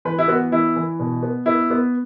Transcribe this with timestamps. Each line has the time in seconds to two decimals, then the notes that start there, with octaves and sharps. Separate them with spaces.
0.05 E3 B4
0.18 E4
0.28 B3 F#4
0.52 E3 E4
0.76 E3
1.00 B2
1.23 B3
1.46 B3 E4
1.70 B3